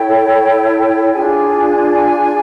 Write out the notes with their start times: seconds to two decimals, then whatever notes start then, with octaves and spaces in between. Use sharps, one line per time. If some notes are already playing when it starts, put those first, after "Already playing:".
Already playing: E4 A4 C#5 G5
1.13 D4 F4 G#4 G#5
1.92 G#5